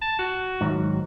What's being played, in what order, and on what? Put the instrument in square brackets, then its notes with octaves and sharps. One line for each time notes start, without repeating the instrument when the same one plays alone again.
[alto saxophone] A5
F#4
[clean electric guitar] G#2 D#3 F#3